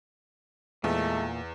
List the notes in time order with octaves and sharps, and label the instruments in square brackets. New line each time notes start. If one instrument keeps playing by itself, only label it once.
[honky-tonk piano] E2 [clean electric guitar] A#2 [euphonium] G#3 [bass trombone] A3